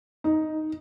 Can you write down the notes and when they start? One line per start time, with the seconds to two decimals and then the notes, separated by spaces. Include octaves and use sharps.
0.24 D#4